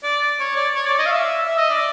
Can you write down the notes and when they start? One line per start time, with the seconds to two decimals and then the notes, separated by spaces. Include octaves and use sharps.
0.03 D5
0.40 C#5
0.56 D5
0.75 C#5
0.86 D5
0.98 D#5
1.06 F5
1.11 E5
1.46 E5
1.58 D#5
1.70 D5